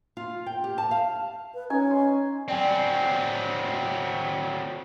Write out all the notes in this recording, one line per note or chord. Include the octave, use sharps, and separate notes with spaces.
F4
G5
G4
A5
F5
B4
C#4 D#4 G#5 C#6
C6
F#3 C4 D5 G5 G#5